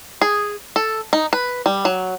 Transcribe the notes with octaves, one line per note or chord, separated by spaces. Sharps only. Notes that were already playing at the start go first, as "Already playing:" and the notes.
G#4
A4
D#4
B4
G3
F#3